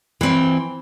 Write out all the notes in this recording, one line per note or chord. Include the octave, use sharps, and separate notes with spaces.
E3 C4